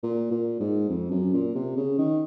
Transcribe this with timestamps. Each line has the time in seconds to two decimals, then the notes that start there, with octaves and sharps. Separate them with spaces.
0.03 A#2
0.31 A#2
0.60 G#2
0.89 F2
1.11 F#2
1.33 A#2
1.55 C3
1.77 C#3
1.98 D#3